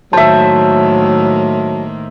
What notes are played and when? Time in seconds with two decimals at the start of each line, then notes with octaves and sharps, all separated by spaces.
0.13 A2 D#3 F#3 A#3 C5 E5 A5